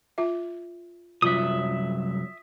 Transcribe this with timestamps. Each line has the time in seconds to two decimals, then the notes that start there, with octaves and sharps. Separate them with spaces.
0.18 F4 E5
1.22 C2 F#2 F#3 F4 E5 D#6